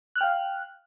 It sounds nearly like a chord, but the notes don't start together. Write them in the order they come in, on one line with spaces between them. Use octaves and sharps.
F#6 F6 G5 F5